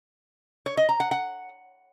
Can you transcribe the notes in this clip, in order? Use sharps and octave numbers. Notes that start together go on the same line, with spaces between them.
C#5
D#5
A#5
F#5
F#5